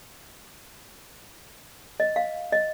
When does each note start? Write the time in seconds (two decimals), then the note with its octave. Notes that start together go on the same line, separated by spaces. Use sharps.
2.00 D#5
2.16 F5
2.52 D#5